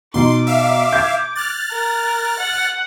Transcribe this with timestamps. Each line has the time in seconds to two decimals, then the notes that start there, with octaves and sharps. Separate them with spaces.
0.14 B2 D#4 C6 D6
0.47 E5 F5
0.92 G6 G#6
1.36 F6 F#6 A6
1.71 A#4
2.39 F#5